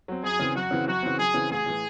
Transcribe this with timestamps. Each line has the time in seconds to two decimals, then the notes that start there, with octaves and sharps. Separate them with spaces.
0.08 F#3 C4
0.23 F#2 G#4
0.39 C#3 E3 C4
0.55 F#2 F#4
0.71 C#3 E3 C4
0.87 F#2 F#4
1.03 C#3 E3 C4
1.19 F#2 G#4
1.34 C#3 E3 C4
1.51 A1 G#4
1.66 A2 E3